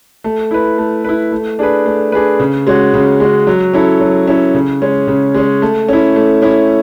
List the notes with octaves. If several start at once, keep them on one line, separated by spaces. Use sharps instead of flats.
A3
E4 B4
A3
E4 B4
A3
D4 G#4 B4
A3
D4 G#4 B4
C#3
G#3 C#4 F#4
C#3
G#3 C#4 F#4
F#3
C#4 E4 A4
F#3
C#4 E4 A4
C#3
G#3 C#4
C#3
G#3 C#4
A3
C#4 E4
A3
C#4 E4